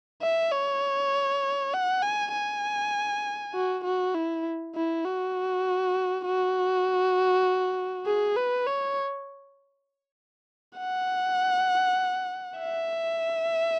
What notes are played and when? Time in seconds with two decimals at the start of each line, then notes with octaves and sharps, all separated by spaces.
0.22 E5
0.52 C#5
1.73 F#5
2.03 G#5
2.33 G#5
3.54 F#4
3.85 F#4
4.15 E4
4.75 E4
5.05 F#4
6.25 F#4
8.06 G#4
8.36 B4
8.67 C#5
10.78 F#5
12.59 E5